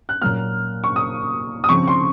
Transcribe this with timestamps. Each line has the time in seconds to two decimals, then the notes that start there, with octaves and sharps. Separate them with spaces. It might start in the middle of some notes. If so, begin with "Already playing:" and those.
0.09 F#6
0.22 A#2 F#3 A#3 F6
0.84 C#6
0.96 D#6
1.64 D#6
1.69 C#3 F3 C4 C#6
1.88 C6